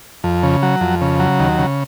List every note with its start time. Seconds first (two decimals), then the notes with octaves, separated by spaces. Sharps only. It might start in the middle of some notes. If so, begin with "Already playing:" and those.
0.24 F2
0.43 C#3
0.63 F#3
0.81 F2
1.01 C#3
1.19 F#3
1.39 D#2
1.58 C#3